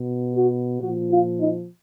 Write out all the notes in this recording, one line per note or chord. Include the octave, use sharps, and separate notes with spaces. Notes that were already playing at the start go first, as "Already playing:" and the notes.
Already playing: B2
F#4
A#2 F3 F#4
F4
D#4